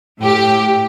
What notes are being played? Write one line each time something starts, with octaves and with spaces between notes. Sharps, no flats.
A2 G4